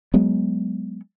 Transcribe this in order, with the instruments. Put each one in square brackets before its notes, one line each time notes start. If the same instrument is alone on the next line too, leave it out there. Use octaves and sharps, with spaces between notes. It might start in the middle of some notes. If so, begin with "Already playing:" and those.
[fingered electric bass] F#3 G#3 B3